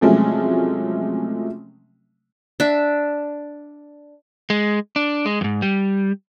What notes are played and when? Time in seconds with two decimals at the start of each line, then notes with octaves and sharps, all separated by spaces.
0.01 C3 F3 F#3 G#3 A3 C#4
2.60 D4 E5
4.50 G#3
4.96 D4
5.26 G#3
5.41 F2 G#2
5.62 G3